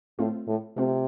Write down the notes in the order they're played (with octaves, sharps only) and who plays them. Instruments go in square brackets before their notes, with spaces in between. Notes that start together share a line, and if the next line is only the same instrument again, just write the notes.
[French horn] A2 [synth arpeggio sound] A3 C4 F4
[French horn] A2
[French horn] C3 [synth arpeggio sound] A3 C4 F4